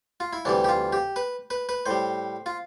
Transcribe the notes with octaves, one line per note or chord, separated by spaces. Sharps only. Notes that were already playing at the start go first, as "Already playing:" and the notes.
F4
E4
D2 C3 E3 G3 D4
G4
F4
G4
B4
B4
B4
A2 G3 C5
F4